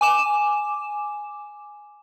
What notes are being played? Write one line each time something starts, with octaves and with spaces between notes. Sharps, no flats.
G#5 D6 E7